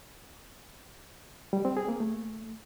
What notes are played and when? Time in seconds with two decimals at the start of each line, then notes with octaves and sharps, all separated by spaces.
1.53 G3
1.65 C4
1.77 G#4
1.88 A#3
2.00 A3